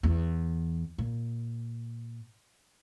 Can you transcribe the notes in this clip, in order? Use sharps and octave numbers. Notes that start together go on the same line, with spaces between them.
E2
A#2